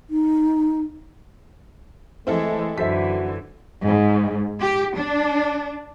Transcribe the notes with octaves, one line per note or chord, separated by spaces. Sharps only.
D#4
E3 G#3 A3 C4 E4 A4
F#2 D3 E3 F#4 A4 C5 E5 B6
G#2
G4
D4